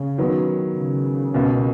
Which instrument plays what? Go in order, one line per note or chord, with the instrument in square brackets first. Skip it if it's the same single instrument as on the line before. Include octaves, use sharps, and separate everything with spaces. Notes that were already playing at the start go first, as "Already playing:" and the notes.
Already playing: [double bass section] C#3
[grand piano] D#3 F#3 B3
[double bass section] C#3
[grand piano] C#2 B2 A#3